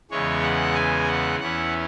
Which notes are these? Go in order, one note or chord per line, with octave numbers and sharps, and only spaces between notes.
E2 C#3 E3 G#3 C#5
F#5
G#5
F#5
E2 E3 C#4 E4 F#5